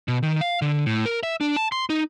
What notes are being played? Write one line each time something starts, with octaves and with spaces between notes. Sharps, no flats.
B2
D#3
F5
D3
A2
A#4
E5
D4
A5
C6
D#4